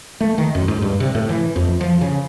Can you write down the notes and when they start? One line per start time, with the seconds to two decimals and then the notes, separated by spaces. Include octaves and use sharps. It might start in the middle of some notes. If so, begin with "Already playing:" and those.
0.21 A3
0.38 D#3
0.55 F#2
0.68 G#2
0.82 G2
1.00 C3
1.15 A2
1.29 E3
1.56 F2
1.81 F3
2.01 C#3